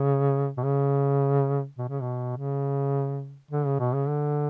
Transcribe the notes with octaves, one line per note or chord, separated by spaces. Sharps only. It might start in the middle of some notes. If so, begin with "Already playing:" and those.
Already playing: C#3
B2
C#3
B2
C#3
B2
C#3
D3
C#3
B2
C#3
D3